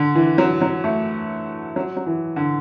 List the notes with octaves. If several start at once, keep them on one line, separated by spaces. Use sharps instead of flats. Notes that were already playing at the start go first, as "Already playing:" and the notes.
Already playing: D3
E3
F#3
F#3
A3
F#3
F#3
E3
D3